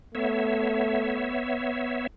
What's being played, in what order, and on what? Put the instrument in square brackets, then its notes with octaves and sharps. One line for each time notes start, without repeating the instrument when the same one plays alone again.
[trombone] A3 [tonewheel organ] B3 C#5 E5